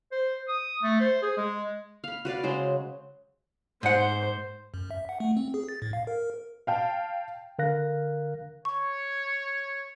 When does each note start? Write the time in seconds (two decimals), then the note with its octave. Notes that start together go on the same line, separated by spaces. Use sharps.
0.12 C5
0.48 D#6
0.83 A3
1.00 C5
1.22 G#4
1.37 G#3
2.04 F5 B5
2.25 F#4 B4 D5 F5
2.43 C#3 F#3 G#3 C5
3.83 G#2 C5 F#5
4.74 F#2
4.91 E5
5.09 F#5
5.20 A3
5.37 C4
5.54 G#4
5.69 A6
5.82 A2
5.93 F5
6.07 A#4
6.67 F5 G5 A5
7.59 D3 A#4 F5 F#6 A#6
8.65 C#5 C#6